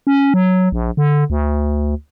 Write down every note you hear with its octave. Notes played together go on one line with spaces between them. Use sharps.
C#4
F#3
A#1
D3
D2